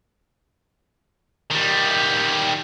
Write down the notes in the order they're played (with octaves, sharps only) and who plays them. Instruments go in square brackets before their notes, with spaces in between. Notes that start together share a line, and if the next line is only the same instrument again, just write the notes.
[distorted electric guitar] D#3 G3